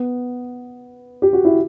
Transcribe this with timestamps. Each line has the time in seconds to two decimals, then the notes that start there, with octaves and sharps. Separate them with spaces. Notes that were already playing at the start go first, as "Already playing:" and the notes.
Already playing: B3
1.22 G4
1.33 F#4
1.45 E4